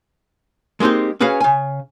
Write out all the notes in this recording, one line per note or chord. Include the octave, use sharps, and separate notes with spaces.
G#3 A#3 C4 D#4 G4
C#4 F#4 G#4 B4 F5
C#3 G#5